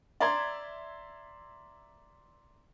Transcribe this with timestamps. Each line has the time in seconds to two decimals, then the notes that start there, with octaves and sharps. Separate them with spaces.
0.20 D5 E5 A#5 C6 G#6